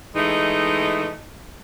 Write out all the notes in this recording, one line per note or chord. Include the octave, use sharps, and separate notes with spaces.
E3 G#3 A3 D#4